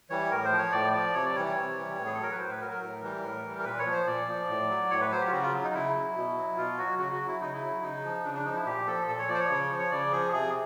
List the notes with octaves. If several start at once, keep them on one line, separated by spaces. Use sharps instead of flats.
E3 G3 C#5
A2 A#4
C5
F3
C#5
A2 D5
F3 D5
C3 C#5
D5
E3 G3 C#5
C#5
C3
E3 G3
A2
G#4
A4
F#3 A#4
B4
A2 C5
B4
F#3 A#4
A#4
A2
E3 G3
A2
E3 G3
A#4
A#2 B4
C#5
F3
C5
A#2 D5
F3
A2
F#3
A2 C#5
B4
F#3 C5
G4
F4
C#3 F#4
F4
F#3
D#4
C#3 E4
F#3
B2
F#3
B2 F4
F#3 F#4
C#3 F#4
F#4
F#3
E4
C#3 D#4
E4
F#3
C#3 D#4
F3
C#3 D4
D4
F3 D#4
E4
A#2 G4
F3 A4
A#2 A4
C#5
F3 D5
C5
C#5
C#3
F3
C#5
C#3 D5
F3 G#4
C3 G#4